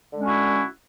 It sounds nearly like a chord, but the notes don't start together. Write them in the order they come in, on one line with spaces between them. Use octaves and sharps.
D3 G#3 C#4 F#4 E4